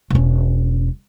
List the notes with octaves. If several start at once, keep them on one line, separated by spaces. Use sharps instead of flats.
E1 C#4